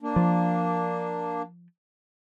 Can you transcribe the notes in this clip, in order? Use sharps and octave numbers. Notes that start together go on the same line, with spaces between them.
A#3 D4
F3